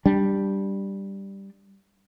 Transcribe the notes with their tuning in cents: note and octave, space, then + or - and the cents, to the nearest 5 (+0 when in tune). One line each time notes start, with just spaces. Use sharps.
G3 +0 D4 +0